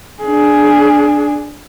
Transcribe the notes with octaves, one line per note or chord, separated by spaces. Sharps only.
D4 G#4